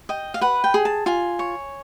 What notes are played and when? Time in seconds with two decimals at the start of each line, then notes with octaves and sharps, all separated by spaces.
0.09 D#5 G5
0.34 F5
0.41 B4 F#5
0.64 G5
0.74 G#4
0.85 A5
1.06 F4 G#5
1.39 C#5